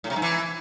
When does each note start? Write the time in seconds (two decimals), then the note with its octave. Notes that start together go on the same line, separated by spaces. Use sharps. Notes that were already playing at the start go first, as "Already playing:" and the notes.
0.04 A2
0.10 C3
0.16 G#2
0.22 E3